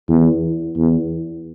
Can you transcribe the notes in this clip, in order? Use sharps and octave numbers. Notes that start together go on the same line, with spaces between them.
E2
E2